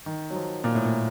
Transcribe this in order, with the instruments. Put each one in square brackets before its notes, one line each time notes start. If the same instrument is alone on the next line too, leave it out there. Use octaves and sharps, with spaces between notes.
[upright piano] D#3
F#3
F3
A#2
A2
A#2